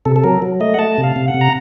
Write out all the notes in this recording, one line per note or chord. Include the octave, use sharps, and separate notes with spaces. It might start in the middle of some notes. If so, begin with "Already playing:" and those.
C3 A4
A4
F#3 A#4
F#3
A3 D#5
F#5
A3 A5
C3
F5
C3
F#5
C3
A#5